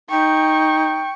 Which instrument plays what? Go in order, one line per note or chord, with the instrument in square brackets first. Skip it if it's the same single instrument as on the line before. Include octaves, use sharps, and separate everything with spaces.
[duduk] D#4 [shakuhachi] G5 [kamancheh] C#6